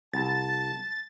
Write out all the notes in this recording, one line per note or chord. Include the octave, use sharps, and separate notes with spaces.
C2 A5 A6